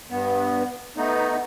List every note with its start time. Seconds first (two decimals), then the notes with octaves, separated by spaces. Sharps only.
0.10 G2 B3
0.97 A3 B3 D#4